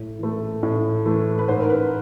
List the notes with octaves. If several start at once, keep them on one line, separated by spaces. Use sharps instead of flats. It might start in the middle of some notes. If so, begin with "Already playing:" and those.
Already playing: A2
E3 A3
A2
E3 A3
B4
G#2 C5
A#4
B4